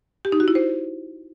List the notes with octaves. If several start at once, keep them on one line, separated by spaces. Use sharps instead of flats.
G4
D#4
F#4
E4
C5